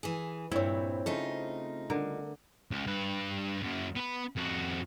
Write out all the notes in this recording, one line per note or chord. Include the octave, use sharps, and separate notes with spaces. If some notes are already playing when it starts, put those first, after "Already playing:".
E3 G#4
G2 A#2 C4 E4 C#5
C#3 A3 D#4 F4
D3 A#4
C#2
G2 B4
F#2 A#3
B3 B5
F2 F#4